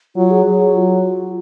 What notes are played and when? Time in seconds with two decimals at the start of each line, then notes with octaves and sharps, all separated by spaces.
0.16 F#3 F4
0.30 G#4
0.45 F#3 G#4
0.75 F4